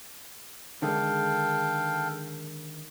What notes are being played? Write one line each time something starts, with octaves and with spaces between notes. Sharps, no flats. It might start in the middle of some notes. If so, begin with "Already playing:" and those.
D3 D#3 G#3 A4 F5 G5